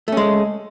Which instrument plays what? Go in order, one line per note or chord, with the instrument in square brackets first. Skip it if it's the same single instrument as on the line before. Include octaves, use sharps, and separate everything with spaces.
[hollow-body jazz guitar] A3
C#4
G#3